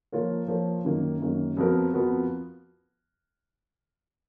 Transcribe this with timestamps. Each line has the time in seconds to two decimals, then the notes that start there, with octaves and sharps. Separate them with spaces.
0.12 F3 A#3 F4 A#4 C#5
0.48 F3 A#3 F4 A#4 C#5
0.85 F#2 D#3 A#3
1.22 F#2 D#3 A#3
1.57 F2 F3 B3 F#4 A#4
1.93 F2 F3 B3 F#4 A#4